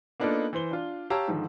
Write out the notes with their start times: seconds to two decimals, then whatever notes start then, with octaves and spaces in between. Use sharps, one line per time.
0.20 A#3 B3 D4 D#4 F4 A4
0.53 E3 C5 G7
0.71 D4 F4
1.10 G4 C#5 F5 A5 A#5 E6
1.28 G#2 D3 D#3 F3